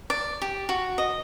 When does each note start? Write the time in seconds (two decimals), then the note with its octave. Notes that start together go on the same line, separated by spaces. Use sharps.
0.10 D5
0.42 G4
0.69 F#4
0.98 D#5